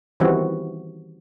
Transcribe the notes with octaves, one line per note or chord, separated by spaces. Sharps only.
D#3 E3 G3 B3 C4 F#4